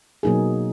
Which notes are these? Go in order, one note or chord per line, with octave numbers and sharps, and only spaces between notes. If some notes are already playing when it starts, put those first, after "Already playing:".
B2 F#3 A#3 D#4 G#4